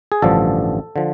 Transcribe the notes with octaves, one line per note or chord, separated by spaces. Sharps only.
G#4
A1 G2 D3 F3 A4
D3 F3